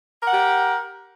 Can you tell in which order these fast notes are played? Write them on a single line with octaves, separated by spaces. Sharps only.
A#4 F#5 G4